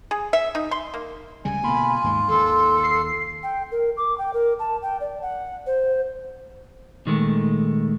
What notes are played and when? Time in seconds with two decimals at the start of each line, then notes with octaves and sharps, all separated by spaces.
0.11 G#4
0.33 E5
0.55 D#4
0.71 C6
0.94 A#3
1.45 C#2 C#3 G3 G#5
1.63 B2 D3 A#3 F4 B5
2.04 D#2 G#2 G#3
2.28 D#2 D#3 A4 C6
2.83 C7
3.43 G5
3.72 A#4
3.97 D6
4.18 G5
4.34 A#4
4.59 A5
4.82 G5
5.01 D5
5.22 F#5
5.67 C5
7.06 A#2 D#3 G#3 A3